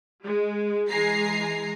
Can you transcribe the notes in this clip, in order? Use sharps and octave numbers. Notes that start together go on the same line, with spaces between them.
G#3
E3 G#3 G#5 A#5 C7